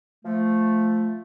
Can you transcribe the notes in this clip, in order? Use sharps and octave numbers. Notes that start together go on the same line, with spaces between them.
F3 A3